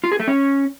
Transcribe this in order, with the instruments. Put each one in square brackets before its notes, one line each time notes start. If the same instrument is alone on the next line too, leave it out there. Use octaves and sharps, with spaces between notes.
[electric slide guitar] F4
G#4
A3
C#4